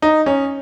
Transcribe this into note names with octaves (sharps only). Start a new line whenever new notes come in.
D#4
C#4